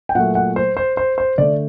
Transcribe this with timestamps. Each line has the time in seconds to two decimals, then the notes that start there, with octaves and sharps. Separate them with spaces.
0.09 G5
0.15 A#2 F#3 A3 F#5
0.35 F#5
0.56 C5
0.77 C5
0.97 C5
1.18 C5
1.38 D3 A3 D5